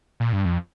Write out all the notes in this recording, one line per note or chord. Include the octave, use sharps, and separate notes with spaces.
A#2
G2
F2